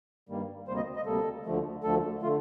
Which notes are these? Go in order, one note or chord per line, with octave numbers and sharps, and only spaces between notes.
G2 D#3 G3 A#3
D2 C3 G3 A#3 C5
D#5
D#5
D2 C3 G3 A#3 A4
D2 D3 F3 A3
D2 D3 F3 A3 A4
D3 A3 F4